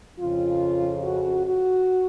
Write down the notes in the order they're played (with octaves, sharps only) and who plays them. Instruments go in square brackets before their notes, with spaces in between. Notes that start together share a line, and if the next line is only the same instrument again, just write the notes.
[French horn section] F2 C#3 F4
F#4
F#4